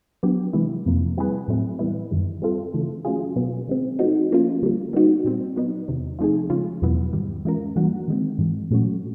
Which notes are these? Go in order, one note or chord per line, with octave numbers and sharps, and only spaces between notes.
F#3 B3 D4 G4
C3 E3 G#3 B3 E4
F2 C3 F3 A#3
G3 C4 E4 G#4 B4
A2 F#3 A3 C4
E3 G3 B3 E4
F#2 D#3 G3
G3 C4 F4 A4
C#3 E3 A3
F#3 A3 C#4 F4 G#4
B2 F#3 B3
D#3 G#3 C4
F3 A3 C4 D#4 F#4
F3 A#3 C#4 F4
D3 G3 A#3
G3 B3 D#4 F#4
A#2 G3 C4
F#3 B3 D#4
E2 C3 D#3
F3 A3 C4 D#4 G#4
C#3 F3 G#3 C#4 F4
E2 B2 F#3 B3 E4
G#2 D#3 G3
E3 G#3 C#4 F4 A#4
E3 G3 A#3 D4 F#4
D#3 G#3 C4
G#2 E3 G#3
A#2 F#3 A3 C#4 F#4